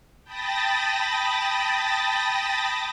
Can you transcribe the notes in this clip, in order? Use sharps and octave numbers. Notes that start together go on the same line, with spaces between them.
G5 A5 B5 D#6 A6 A#6